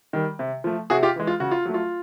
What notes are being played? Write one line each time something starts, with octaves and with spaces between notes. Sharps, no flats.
D#3 G3
C3
F3 A3
C3 F#4 G#4
F4 G4
E3 G#3
F4
C#3 F#4
F4
F#3 A3
F4